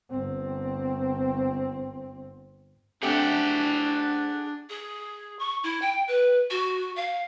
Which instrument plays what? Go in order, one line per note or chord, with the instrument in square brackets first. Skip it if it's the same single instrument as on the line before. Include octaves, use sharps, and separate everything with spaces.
[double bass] G1 C4
[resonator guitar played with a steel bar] A3 C4 G4 [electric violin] D4 [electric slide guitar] G#4 F#5 G5
[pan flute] G#4
C#6
E4
G5
B4
F#4
F5